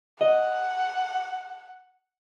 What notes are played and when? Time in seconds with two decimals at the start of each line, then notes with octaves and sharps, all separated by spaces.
0.21 D#5 F#5